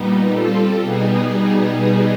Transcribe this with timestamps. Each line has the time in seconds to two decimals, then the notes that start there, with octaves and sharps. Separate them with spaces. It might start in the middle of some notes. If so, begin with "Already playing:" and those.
Already playing: A#2 G3 B3 D#4
0.30 G3 C4 F4 A4
0.81 B2 G3 B3 D#4 G#4